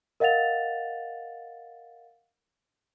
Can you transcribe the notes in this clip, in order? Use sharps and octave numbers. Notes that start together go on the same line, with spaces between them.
A#4 D#5 F5 F#5 A6 F7